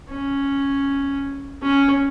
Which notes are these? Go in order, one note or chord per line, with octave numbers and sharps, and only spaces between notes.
C#4
C#4